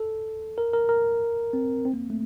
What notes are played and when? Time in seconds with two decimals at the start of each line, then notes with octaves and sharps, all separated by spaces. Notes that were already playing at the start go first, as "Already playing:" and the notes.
Already playing: A4
0.58 A#4
0.73 A#4
0.89 A#4
1.53 C4
1.85 C4
1.94 A#3
2.10 A3